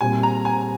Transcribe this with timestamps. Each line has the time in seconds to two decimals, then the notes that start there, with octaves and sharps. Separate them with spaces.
0.01 A#2 G3 C4 G#5
0.23 A#5
0.45 G#5